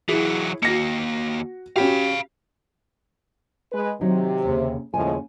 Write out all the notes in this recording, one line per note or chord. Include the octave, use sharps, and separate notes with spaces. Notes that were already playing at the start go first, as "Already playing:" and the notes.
E3 F#3 E4 G#4
D#2 A#3 F#4 A#6 C#7
C#4 F#4 G4 F5 B5
G#3 B4
C3 D#3 F#3 D#4
D#2 C#3
D#2 A2 C#3 F3 G#3 G#5